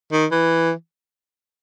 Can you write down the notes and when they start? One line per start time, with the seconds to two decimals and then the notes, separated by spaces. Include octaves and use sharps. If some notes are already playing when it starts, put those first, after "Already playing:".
0.12 D#3
0.31 E3